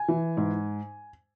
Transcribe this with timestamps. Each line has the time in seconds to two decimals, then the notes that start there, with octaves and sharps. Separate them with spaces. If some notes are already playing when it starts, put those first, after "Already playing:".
Already playing: G#5
0.08 E3
0.37 G#2